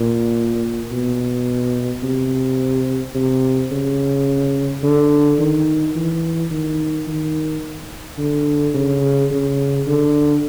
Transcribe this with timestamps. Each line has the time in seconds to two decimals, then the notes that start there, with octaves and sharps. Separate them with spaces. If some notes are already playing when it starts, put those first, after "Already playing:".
Already playing: A#2
0.91 B2
2.03 C3
3.15 C3
3.72 C#3
4.83 D3
5.39 D#3
5.95 E3
6.51 D#3
7.07 D#3
8.18 D3
8.75 C#3
9.31 C#3
9.87 D3